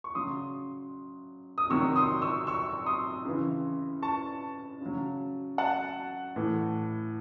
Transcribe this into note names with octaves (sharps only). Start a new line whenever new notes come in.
C#6
C#3 F#3 C6 D#6
D#6
C3 D#3 F#3 C#6 E6
C6 D#6
C#6 E6
C#6 E6
C6 D#6
C#3 E3
A5 C#6
C#3 F#3
F#5 A5
A2 E3